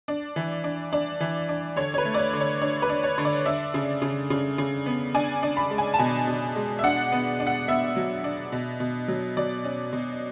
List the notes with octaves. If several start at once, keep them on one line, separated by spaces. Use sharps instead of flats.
D4
E3
D4
D4 D5
E3
D4
D3 C#5
C#5
B4
A3
D5
C#5
D3
C#5
D4 C#5
B4
D4
C#5
D3
D5
D4 E5
C#3
C#3
C#3
C#3
B3
D4 G#5
D4
B5
G#3
G#5
A5
B2 G#5
B2
G#3
E5
D4 F#5
B3
D4
F#5
B3 E5
F#3
D4
B2
B2
F#3
F#3 D5
C#4
B2